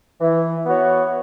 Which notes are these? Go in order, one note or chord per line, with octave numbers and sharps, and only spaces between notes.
E3
B3 F#4 C#5